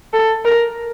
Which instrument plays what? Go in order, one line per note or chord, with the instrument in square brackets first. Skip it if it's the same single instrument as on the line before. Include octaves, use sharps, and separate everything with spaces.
[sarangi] A4
A#4